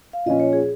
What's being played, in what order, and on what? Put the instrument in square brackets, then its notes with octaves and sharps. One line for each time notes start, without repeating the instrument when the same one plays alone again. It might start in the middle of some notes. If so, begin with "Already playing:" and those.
[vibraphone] F5
[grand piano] A#2 F3 C#4 [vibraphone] D#5
[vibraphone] C#5
G#4